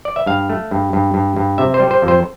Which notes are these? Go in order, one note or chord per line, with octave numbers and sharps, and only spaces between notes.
D5
E5
G2 F5
A3
G2
G2
G2
G2
C3 E5
C5
G3
C5
F2
C5